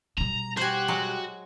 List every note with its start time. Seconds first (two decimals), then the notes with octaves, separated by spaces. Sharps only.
0.18 B2 G3 A#5
0.57 F#4 G4 C5 G#5 F#6
0.88 F#3 G#3